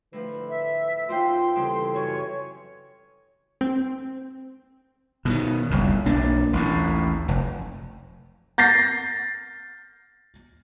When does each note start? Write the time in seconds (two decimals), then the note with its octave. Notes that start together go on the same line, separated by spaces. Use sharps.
0.13 A2 D3 F3 B4
0.49 E5
1.09 D#2 F4 C5 G5 C6
1.56 C#3 E3 G3 C4 A4
1.94 F#2 C#5 G#5 C#6
3.61 C4
5.25 B2 D3 D#3
5.71 F#1 C2 F2
6.06 B1 A#3 D4
6.53 A1 D#2 A2
7.28 F1
8.58 G6 A6 A#6 C7